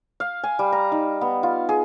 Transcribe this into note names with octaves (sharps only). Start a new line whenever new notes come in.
F5
G#5
G3
A#5
D#4
B3
F4
G#4